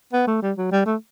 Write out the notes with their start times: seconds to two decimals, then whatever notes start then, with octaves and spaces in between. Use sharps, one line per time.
0.13 B3
0.27 A3
0.42 G3
0.57 F#3
0.71 G3
0.86 A3